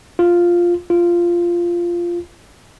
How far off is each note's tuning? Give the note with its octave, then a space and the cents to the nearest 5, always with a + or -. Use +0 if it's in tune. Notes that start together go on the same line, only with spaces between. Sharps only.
F4 +0
F4 -10